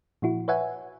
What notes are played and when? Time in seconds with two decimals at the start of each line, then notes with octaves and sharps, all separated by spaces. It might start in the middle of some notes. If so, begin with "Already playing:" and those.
0.22 A#2 F3 E4 F#4
0.48 B4 C#5 E5 F#5 G#5